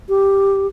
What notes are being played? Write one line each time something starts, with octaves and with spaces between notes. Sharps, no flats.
G4